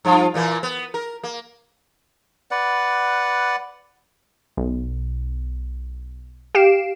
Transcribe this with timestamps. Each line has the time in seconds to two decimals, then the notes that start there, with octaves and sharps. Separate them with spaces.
0.05 G2 F3 F4
0.34 A#2 E3 A#3
0.63 B3
0.94 A#4
1.23 A#3
2.51 B4 D5 F#5
4.57 B1
6.55 G4 F5 C7 D7 E7